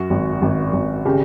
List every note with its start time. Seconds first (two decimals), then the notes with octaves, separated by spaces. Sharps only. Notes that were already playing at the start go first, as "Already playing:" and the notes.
Already playing: F#2 F#4
0.10 G#1
0.42 G#1
0.73 G#1
1.05 C#3 G4